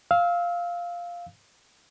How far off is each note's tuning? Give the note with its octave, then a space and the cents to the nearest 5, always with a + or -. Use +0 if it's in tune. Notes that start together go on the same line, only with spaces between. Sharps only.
F5 +0 E6 -25